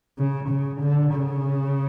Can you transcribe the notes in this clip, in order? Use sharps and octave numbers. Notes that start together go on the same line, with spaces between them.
C#3
C#3
D3
C#3